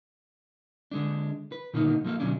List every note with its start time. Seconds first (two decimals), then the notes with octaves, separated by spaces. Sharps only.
0.91 D3 G#3 D4
1.52 B4
1.74 A#2 D3 D#3 A#3 B3 D#4
2.04 F3 A#3 A4 F5
2.20 D2 B2 F#3 C#4 D4